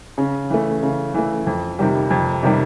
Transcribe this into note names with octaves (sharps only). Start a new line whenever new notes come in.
C#3
E3 A3
C#3
E3 A3
F2
C3 D#3 G3
F2
C3 D#3 G3